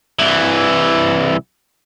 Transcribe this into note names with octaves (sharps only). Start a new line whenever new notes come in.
C2 E3